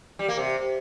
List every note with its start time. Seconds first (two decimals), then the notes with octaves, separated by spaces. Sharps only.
0.19 G3
0.28 A#3
0.38 C3